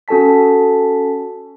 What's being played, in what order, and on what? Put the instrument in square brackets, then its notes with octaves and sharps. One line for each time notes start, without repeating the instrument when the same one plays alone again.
[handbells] C#4 F#4 A4 G#5 A5 B6